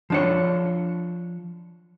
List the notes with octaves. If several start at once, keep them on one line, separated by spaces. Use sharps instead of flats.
F3 D4 C#5